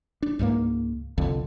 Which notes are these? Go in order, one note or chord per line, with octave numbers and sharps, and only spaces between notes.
D4
C#2 G#2 G3 A#3
C2 F2 D3